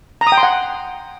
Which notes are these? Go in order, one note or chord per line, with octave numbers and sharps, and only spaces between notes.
A#5
D#6
G5
C6
F#5